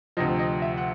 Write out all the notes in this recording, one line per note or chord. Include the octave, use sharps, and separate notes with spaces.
D2 C3 F3 D#5
D#5
E5
F#5